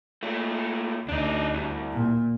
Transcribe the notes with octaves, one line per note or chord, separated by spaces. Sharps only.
A#2 A3
D2 D4 D#4
C2
A#2